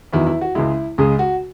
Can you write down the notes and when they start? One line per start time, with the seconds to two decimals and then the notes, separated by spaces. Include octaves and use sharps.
0.13 E2 D#3 F#3 E4
0.27 E4
0.41 F#4
0.55 C#2 C#3 G#3 E4
0.98 C#2 C#3 G#3 G#4
1.19 F#4